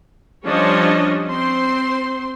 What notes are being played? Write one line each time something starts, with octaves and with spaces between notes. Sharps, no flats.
F3 G3 C#4 D4 C#5 D#5
C4 C5 C6